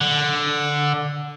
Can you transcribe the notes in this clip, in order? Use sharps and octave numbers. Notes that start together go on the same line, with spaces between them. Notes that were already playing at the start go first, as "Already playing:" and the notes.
D3